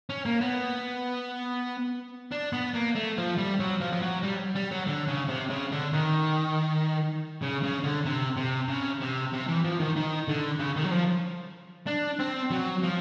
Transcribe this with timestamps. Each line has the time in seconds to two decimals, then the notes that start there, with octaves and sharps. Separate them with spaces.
0.09 C#4
0.25 A#3
0.41 B3
2.32 D4
2.53 B3
2.74 A#3
2.95 A3
3.18 F3
3.38 G3
3.60 F#3
3.81 F3
3.92 F3
4.02 F#3
4.23 G3
4.55 G3
4.71 F#3
4.87 D3
5.07 C#3
5.29 C3
5.50 C#3
5.72 D3
5.93 D#3
7.42 C#3
7.63 C#3
7.84 D3
8.05 C3
8.37 C3
8.68 C#3
9.01 C3
9.33 C3
9.48 E3
9.64 F3
9.80 D#3
9.96 D#3
10.28 D3
10.59 C#3
10.76 D#3
10.84 F#3
10.91 F3
11.87 D4
12.19 C4
12.51 F#3
12.83 F3